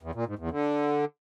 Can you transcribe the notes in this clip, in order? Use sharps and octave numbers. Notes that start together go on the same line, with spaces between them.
E2
A#2
G#2
E2
D3